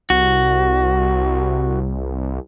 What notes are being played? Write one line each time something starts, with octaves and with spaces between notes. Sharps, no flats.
C2 F#4